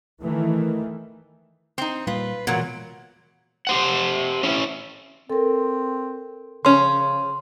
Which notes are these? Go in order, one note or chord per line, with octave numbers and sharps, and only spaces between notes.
D#3 E3 A3
C4 D#4
A#2 G3 A#3 F4 B4
A#2 E3 F#3 G#3 B3 F#5
G4 C5 F#5
C#4 E4
C4 A4 A#4
C#3 F3 C#4 C6